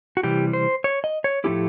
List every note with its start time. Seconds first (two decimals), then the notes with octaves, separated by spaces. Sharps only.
0.17 F#4
0.23 C3 E3 G3 G4
0.53 C5
0.84 C#5
1.04 D#5
1.24 C#5
1.44 A2 F3 A3 C#4 E4 G4